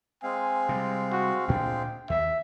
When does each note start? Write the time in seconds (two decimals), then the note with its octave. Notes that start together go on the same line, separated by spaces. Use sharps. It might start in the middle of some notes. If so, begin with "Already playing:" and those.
0.23 G#3 C4 F5 G#5
0.69 C3 G3
1.12 F#4
1.48 D2 A#2 D4 G5
2.10 D#2 E5